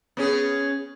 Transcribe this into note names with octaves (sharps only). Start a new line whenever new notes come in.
B3 C#4 G#4